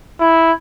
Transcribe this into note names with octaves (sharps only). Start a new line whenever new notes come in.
E4